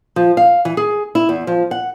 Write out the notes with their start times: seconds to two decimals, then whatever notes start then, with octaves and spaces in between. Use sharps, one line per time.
0.16 F3
0.37 F5
0.65 E3
0.77 G#4
1.15 E4
1.29 E2
1.47 F3
1.71 F#5